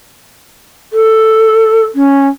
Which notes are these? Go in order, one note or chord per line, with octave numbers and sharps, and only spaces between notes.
A4
C#4